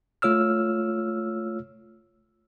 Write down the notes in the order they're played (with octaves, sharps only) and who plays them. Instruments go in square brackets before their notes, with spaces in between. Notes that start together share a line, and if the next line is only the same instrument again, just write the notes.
[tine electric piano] A3 F4 C#5 E6 F6